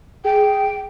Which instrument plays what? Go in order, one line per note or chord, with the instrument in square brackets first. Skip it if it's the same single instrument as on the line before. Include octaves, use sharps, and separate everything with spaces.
[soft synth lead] G#4 [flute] G5